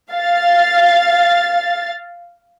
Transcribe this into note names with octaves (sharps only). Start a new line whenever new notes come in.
F5 A6